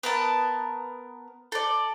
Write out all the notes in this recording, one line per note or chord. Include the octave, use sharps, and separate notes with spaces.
B3 A#4 A5
A4 D5